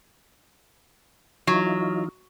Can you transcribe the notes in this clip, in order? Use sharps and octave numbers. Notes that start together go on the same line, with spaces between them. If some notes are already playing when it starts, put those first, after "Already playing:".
E3 F#3 D#4 F4